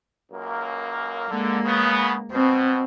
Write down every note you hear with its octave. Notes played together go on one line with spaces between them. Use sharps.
C#2 F#2 A#3
D3 G#3 A#3
C#3 B3
B2 C4